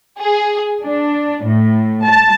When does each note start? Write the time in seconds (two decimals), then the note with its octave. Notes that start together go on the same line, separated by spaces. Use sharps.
0.21 G#4
0.83 D4
1.44 A2
2.05 A5